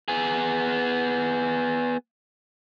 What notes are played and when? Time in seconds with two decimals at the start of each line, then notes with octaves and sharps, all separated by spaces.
0.08 B3 G#4